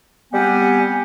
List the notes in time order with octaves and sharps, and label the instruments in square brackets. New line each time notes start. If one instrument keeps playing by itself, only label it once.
[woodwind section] G3 B3 C4 G4 F#5 G#5